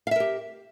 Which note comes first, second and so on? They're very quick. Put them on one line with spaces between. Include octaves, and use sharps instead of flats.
F5 E5 A#4 G4